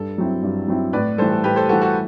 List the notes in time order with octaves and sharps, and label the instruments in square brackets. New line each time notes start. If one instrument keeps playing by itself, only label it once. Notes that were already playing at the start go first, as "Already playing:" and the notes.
Already playing: [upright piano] G2 [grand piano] A4
[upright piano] F#3 C4 E4
G2
F#3 C4 E4
[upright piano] A2 [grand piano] B4 D5
[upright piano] E3 G3 [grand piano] A4 C5
[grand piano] A4
[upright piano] A2 [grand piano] G4 B4
[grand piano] A4 C5
[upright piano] E3 G3 [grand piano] F#4 A4
[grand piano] F#4 A4